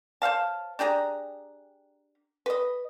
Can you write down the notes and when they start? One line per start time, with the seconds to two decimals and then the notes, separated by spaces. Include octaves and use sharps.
0.22 C5 C#5 F5 A5
0.79 D4 G4 G#4 A#5
2.46 B4 D#5